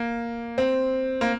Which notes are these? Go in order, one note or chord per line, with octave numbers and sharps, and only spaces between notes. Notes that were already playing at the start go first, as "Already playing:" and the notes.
Already playing: A#3
C4
A#3